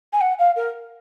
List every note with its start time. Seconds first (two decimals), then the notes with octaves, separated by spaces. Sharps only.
0.13 G#5
0.21 F#5
0.39 F5
0.56 A#4